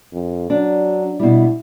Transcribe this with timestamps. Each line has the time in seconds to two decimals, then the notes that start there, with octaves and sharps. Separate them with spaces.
0.13 F2
0.50 F#3 D4
1.20 B2 G3 E4